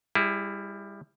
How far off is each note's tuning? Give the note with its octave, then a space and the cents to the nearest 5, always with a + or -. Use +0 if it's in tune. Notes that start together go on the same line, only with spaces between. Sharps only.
G3 +25 E4 +0 G#4 +0